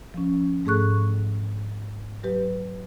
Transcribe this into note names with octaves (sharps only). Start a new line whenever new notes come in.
F3 C#4
G#2 A3 G#4 A4 C#6 F#6
F#3 G4 B4